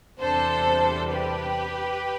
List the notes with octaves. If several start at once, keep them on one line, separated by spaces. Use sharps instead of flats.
E2 C3 G3 D4 A4 C5
G4 B4